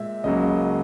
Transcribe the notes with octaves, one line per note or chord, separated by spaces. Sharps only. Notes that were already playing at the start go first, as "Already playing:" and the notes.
Already playing: A#2 G#3 E5
C#2 C#3 F#3 A#3 D#5